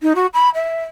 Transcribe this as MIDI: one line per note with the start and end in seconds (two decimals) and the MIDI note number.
0.02 0.13 63
0.15 0.27 66
0.34 0.50 83
0.55 0.83 76